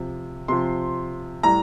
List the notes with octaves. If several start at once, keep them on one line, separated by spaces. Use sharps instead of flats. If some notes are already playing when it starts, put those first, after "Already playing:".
Already playing: C3 F3
C3 F3 C6
A2 G3 A#5